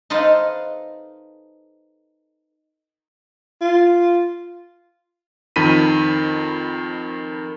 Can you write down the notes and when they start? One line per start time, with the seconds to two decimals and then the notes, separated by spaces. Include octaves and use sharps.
0.10 D#4 A4 B4 C5 F5
3.61 F4
5.56 F2 D#3 A#4 B5 B6 D#7